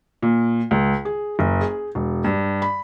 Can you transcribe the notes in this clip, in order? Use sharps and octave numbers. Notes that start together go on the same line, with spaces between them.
A#2
C#2
G#4
F#1
G#4
E1
G2
B5